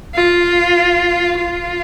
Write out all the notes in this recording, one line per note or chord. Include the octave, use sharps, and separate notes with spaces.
F4
F4